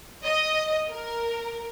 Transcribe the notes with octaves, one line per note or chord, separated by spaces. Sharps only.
D#5
A#4